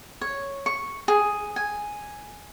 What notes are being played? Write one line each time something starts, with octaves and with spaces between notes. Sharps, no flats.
C#5
C#6
G#4
G#5